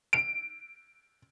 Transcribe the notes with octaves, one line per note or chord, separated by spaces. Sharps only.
D7